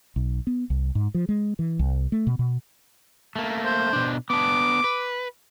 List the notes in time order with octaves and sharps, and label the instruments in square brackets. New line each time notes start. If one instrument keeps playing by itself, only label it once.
[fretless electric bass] B1
B3
C2
G#2
F3
G#3
E3
C2
A3
B2
B2
[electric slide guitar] A3 A#3
[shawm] C5
[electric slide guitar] B2 D4
[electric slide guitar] B3 D4 [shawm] D6
[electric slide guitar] B4